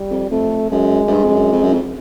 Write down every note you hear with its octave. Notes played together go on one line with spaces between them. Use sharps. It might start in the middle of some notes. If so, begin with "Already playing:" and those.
Already playing: G3
F2
F2 A3
F#2 G#3
F#2
G2
F2
F#2
F2
F#2
F2